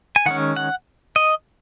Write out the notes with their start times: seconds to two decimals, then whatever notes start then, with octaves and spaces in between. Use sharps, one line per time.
0.16 G#5
0.26 D#3 G#3 C#4 F#5
0.56 F#5
1.16 D#5